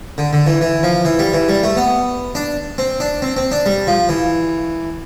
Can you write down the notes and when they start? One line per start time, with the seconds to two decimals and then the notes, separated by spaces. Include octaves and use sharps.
0.18 D3
0.33 D3
0.47 E3
0.61 E3
0.83 F3
1.05 E3
1.19 G3
1.33 E3
1.49 G3
1.63 A3
1.77 B3
2.35 D4
2.78 C4
3.00 D4
3.22 C4
3.37 C4
3.52 D4
3.66 G3
3.87 F3
4.09 E3